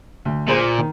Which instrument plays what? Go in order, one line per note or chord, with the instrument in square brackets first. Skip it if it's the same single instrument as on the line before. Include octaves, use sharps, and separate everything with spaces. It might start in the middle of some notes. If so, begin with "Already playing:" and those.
[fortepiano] D2
[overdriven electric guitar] A#2 [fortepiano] G#4 C5 C6
[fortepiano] D#3